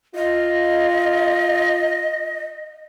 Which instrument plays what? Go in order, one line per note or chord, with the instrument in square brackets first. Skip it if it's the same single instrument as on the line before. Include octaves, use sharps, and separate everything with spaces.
[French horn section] F4 [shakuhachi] D#5